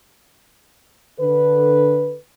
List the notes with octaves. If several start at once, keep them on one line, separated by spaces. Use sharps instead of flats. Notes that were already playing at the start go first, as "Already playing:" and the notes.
D3 A4 B4